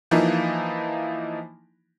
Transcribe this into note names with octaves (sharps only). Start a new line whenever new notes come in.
E3 F3 A#3 D#4 E4